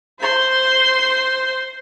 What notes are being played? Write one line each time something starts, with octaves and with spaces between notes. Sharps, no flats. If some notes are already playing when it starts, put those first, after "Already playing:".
C5 C6